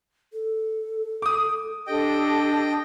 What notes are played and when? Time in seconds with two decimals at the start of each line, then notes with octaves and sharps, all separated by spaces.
0.33 A4
1.22 D6 D#6
1.87 D4 G4 A4 D#5 G5